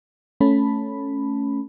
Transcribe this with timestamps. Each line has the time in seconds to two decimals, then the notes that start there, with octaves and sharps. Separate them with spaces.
0.41 A3 C#4 A5 B5